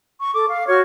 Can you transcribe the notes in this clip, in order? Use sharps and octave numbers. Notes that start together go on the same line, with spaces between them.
C#6
A4 D6
F5
F#4 C#5 C#6 F6